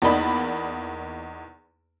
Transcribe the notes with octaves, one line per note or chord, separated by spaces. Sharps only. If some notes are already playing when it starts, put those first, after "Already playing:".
E2 A#3 D#4 D5 B5